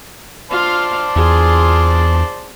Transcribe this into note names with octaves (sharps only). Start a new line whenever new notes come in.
F4 C5 D5 F5 A5
E2 F4 G#4